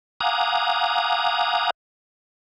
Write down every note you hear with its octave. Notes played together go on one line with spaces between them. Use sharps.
F5 F#5 G#5 A#5 D6 D#6